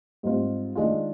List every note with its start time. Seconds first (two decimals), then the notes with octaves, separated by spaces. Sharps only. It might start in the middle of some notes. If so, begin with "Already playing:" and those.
0.23 G#2 G3 C4 F4
0.75 D#3 G#3 D4 F4